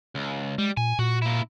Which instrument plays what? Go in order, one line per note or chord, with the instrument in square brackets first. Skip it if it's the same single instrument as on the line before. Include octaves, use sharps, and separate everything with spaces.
[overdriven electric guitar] C#2
[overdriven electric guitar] G3 [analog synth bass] G#3
[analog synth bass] A#2 [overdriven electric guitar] G#5
[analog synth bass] A#2 [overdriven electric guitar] F#4
[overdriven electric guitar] A#3 E4